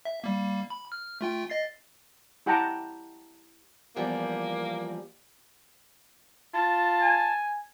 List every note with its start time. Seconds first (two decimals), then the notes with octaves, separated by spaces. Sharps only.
0.05 E5
0.24 G3 A#3
0.70 B5
0.92 F6
1.21 A3 F4 G5
1.50 D#5 A6 C7
2.46 E4 G4 F#5 G5 A5 A#5
3.96 E2 F3 G3 A#3
6.54 F4 A5
7.02 G#5